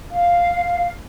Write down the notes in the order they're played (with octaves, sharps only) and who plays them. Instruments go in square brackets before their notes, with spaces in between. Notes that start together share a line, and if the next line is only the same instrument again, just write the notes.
[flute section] F5